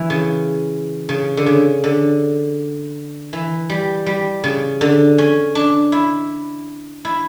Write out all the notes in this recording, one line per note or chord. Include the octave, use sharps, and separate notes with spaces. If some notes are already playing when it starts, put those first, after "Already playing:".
Already playing: E3
C#3
C#3
D3
C#3
D3
E3
G3
G3
C#3
D3
C#4
D4
E4
E4